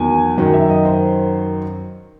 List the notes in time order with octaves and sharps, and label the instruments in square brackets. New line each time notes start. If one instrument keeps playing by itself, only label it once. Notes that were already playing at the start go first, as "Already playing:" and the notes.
Already playing: [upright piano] E2 D#3 F#3 G#5
F#2 D#3 F#3
E5
D#5
C5